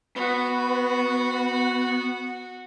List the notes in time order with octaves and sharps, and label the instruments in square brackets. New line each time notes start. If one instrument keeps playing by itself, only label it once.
[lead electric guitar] B3 [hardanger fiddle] F#4 F#5